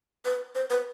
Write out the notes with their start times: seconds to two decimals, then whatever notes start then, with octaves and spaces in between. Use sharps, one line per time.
0.25 B4
0.55 C5
0.70 B4